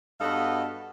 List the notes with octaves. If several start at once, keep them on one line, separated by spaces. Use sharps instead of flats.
G2 B3 F#4 A4 D#5 F5